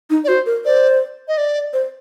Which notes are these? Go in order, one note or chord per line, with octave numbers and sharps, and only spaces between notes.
D#4
D5
F#4 C5
A#4
C5 D5
D#5
D5
C5